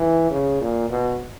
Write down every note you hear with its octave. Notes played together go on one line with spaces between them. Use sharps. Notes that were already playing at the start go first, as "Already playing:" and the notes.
Already playing: E3
C#3
A#2
B2